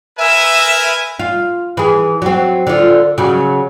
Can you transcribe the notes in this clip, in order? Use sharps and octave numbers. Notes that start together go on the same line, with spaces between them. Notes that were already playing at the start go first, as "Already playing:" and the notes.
A#4 B4 E5 G#5
F4
E3 G#4
F#3 C4
D3 F4
C#3 F#3